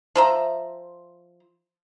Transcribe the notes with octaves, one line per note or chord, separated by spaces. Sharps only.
F3 E5 A#5